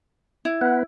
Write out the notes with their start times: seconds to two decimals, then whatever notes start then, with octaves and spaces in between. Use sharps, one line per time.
0.45 E4
0.61 B3 B4 F#5